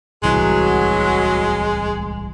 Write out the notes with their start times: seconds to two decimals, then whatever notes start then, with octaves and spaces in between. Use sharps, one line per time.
0.23 D1 C2 E3 F#3 G#3 F#4 G#4